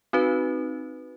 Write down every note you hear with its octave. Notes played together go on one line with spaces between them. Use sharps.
C4 D#4 F#4 B4